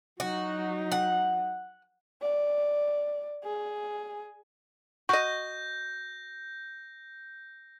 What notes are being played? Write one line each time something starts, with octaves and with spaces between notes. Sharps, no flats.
F#3 D#4 F#4
F#5
D5
G#4
F#4 D#5 C#6 G6 A#6